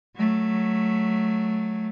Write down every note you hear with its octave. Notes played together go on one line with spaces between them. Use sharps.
F#3 A3